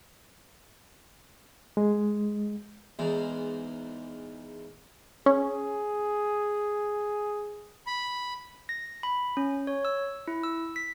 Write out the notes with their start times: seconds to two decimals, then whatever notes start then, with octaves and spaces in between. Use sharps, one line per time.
1.77 G#3
2.99 E2 G#2
5.26 C#4 G#4
7.87 B5
8.69 A#6
9.03 B5
9.37 C#4
9.67 C#5
9.85 E6
10.28 E4
10.44 E6
10.76 B6